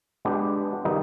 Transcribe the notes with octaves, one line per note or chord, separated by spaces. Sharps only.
G#3 B3 D4 G4
D#3 G3 B3 D#4